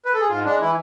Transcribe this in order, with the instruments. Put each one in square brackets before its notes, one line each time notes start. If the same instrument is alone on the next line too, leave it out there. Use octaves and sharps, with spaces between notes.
[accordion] B4
A4
G#4
G#2 F4
G#3 D4
E3 E4